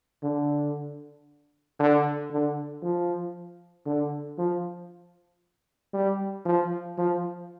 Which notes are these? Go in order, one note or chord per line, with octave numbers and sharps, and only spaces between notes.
D3
D3
D3
F3
D3
F3
G3
F3
F3